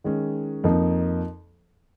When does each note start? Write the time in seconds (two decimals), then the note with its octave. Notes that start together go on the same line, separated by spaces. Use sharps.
0.04 D#3 G#3 C#4
0.64 F2 F3 A#3 D#4